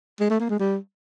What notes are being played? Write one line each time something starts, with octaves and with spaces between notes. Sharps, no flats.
G#3
A3
A#3
G#3
G3